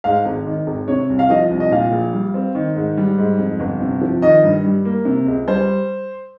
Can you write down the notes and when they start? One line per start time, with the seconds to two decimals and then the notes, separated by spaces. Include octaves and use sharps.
0.04 G#2 F5
0.25 G#1
0.47 D#3
0.67 G#1
0.88 C3 C#5
1.10 C2
1.19 F5
1.30 F3 D#5
1.51 C2
1.60 D#5
1.71 A#2 F5
1.92 A#1
2.13 G3
2.34 C4
2.55 D#3
2.76 G#2
2.97 G3
3.18 G#2
3.38 F2
3.60 G1
3.81 C3
4.01 F3
4.22 D#3 D#5
4.44 G2
4.64 G3
4.85 A#3
5.05 C3
5.26 C#2
5.48 G3 C5